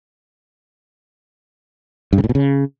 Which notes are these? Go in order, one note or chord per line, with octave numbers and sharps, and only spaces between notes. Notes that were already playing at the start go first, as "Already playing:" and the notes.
G2
C#3
A2
B2
C#3